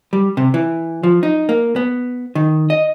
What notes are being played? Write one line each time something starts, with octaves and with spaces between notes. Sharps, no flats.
G3
C3
E3
F3
D#4
A#3
B3
D#3
D#5